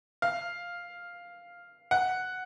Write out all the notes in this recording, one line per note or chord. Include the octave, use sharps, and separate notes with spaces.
F5
F#5